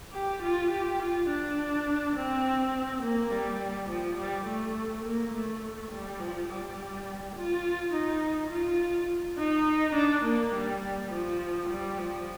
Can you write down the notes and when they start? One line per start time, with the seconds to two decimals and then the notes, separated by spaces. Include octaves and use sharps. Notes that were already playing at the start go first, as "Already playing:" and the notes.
0.13 G4
0.42 F4
0.71 G4
1.00 F4
1.29 D4
2.16 C4
3.02 A#3
3.31 G3
3.89 F3
4.17 G3
4.47 A3
5.05 A#3
5.33 A3
5.92 G3
6.20 F3
6.49 G3
7.36 F4
7.93 D#4
8.51 F4
9.38 D#4
9.95 D4
10.25 A#3
10.54 G3
11.11 F3
11.69 G3
11.98 F3